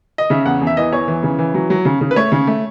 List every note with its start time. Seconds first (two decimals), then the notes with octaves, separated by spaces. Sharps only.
0.18 D#5
0.30 C#3 E5
0.45 E2 F#5
0.61 E2
0.67 E5
0.77 E3 D#5
0.92 E2 C#5
1.08 E3
1.23 C#3
1.39 E3
1.54 F#3
1.70 F#3
1.85 C#3
2.01 C#3
2.11 B4
2.16 A3 C#5
2.32 C#3
2.47 A3